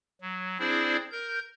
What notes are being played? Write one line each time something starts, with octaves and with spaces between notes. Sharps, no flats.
F#3
C4 D4 E4 G#4 C5 D5
A#4 G6